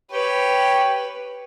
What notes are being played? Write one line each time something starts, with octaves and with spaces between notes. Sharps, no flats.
G4 B4 C#5 G5